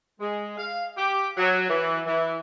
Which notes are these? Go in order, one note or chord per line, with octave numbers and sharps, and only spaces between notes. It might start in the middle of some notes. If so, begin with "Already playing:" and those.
G#3
F5
G4
F#3
E3
E3